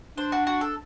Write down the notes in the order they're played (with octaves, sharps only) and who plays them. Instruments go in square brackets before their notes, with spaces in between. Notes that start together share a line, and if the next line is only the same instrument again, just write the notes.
[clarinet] D4 [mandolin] C5
[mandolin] F#4
F#4
A4